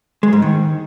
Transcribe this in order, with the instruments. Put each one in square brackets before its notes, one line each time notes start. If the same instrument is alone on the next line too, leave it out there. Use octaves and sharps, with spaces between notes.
[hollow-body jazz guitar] G#3
G#2
D#3